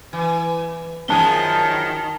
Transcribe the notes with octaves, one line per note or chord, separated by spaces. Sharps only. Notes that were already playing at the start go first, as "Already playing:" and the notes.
E3
F#2 D#3 F3 G#4 A5 G7